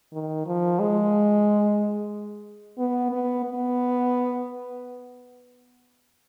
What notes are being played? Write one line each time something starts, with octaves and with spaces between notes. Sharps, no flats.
D#3
F3
G#3
B3
B3
B3